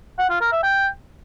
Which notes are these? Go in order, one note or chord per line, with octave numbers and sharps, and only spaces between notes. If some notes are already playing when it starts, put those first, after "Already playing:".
F#5
F4
A#4
E5
G5